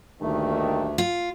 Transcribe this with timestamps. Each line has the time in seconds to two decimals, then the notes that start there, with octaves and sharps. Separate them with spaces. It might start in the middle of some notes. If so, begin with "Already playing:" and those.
0.22 D2 G2 A#2 D#3 A3
0.98 F4